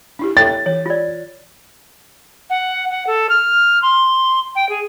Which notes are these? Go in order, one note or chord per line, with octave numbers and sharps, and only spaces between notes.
D4 E4 G4
A4 C#5 G5 A6
E3 C#5
F4 D5
F#5
F#5
A4
F6
C6
G5
G#4